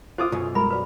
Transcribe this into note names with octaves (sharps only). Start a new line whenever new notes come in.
F4 C5 D6 D#6
B1 F#2 G#5 C6 C#6
G3 G#3 A#4 B5
F#4 B4 D5 B5